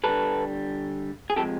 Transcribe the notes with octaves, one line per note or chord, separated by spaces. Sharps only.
D3 G3 A4 B4
G#4
C3 F3 G#3 G4 A4